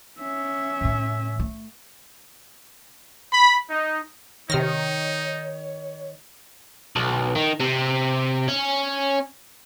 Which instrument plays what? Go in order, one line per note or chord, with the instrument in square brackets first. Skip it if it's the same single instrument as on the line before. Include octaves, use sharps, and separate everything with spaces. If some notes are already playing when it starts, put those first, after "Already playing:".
[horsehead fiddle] C#4 E5
[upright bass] A2 C#3
A3
[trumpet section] B5
D#4
[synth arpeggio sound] C3 F6 A#6 [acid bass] D#3 [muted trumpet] D#4 [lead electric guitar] C#5
[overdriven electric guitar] B1
D#3
C3
C#4